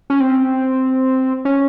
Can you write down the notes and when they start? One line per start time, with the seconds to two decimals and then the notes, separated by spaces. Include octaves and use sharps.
0.10 C#4
0.20 C4
1.45 C#4